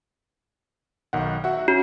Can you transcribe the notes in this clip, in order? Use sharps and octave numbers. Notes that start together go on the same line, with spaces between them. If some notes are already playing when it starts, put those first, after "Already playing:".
B1 D#3 F#5
F#4 E5 F#5
C#4 F#4